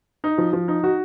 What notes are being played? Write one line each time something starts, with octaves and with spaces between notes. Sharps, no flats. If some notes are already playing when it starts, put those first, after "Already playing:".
D#4
F3
F3
D#4
F#4